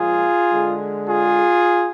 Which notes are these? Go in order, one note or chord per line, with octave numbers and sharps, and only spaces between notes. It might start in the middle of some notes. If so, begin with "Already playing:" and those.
Already playing: A#2 F3 G#3 F4 G#4
D3 G#3
F4 G#4